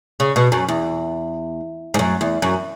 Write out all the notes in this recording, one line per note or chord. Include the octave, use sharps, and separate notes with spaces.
C#3
B2
F#2
E2
G#2
F#2
E2
F#2